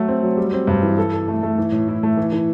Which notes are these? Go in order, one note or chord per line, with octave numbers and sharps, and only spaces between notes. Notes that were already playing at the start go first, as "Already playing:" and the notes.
Already playing: F#3 A3
C4
F#3
G3
C4
G2
E3
A4
A4
A3
A3
E3
A2
E4
A3
E3
E3